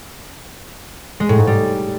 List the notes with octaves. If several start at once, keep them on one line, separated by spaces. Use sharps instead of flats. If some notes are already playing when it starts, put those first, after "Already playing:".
G#3
A2
G#2
G3